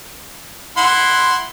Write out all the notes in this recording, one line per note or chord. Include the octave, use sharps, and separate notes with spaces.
E4 F#5 C6